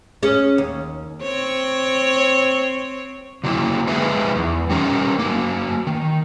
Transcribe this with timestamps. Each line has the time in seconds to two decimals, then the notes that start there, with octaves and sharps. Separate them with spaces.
0.23 C#4 G#4 C#5
0.58 D#2
1.22 C4 C#5
3.44 D3 F#3 A#3 E4
3.87 F3 G#3 D#4 G#4 B4 E5
4.35 E2
4.70 G3 C#4 D#4 A#4
5.19 F#3 A#3
5.87 D#3